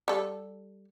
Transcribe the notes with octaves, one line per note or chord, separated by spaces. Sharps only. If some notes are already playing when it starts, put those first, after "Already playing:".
G3 A4